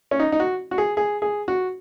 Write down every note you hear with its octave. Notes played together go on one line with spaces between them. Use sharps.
C#4
D#4
D#4
F#4
F#4
G#4
G#4
G#4
F#4